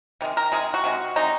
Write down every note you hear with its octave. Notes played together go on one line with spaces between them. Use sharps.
C3 D#3 G#3
A#4
C3 D#3 G#3 G#4
F#4
C3 D#3 G#3
C3 D#3 G#3 D#4